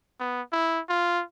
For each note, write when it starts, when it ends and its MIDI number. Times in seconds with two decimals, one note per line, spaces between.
0.20 0.42 59
0.52 0.80 64
0.89 1.22 65